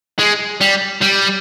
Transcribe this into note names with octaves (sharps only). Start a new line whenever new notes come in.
G#3
G3
G3